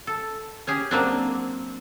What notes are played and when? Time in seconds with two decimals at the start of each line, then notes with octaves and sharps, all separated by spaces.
0.07 A4
0.67 C#4 G4 G#4
0.91 F#3 A#3 C4 D4